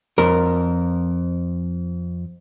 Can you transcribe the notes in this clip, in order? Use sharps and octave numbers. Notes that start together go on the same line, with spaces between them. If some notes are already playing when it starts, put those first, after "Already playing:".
F2 A#4